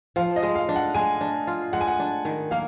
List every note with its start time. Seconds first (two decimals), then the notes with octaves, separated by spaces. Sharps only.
0.16 F3 F5
0.36 D#5
0.43 G#3
0.55 F5
0.69 D4
0.76 F#5
0.94 G#3 G#5
1.21 D4
1.47 F4
1.73 G#3 F#5
1.81 G#5
1.88 F#5
2.00 D4
2.25 D#3
2.51 A#3 F5